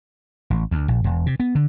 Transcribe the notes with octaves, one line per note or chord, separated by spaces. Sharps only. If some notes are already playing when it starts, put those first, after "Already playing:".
A1
D2
A#1
E1
C3
B3
D3